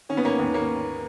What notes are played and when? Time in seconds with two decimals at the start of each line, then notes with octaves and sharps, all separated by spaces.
0.09 D#3 C#4
0.17 B3
0.25 A#3 C#4
0.39 D#2
0.54 A#3 C#4